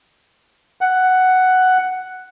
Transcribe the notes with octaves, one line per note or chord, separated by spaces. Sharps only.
F#5